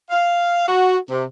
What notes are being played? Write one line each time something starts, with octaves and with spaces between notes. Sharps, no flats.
F5
F#4
C3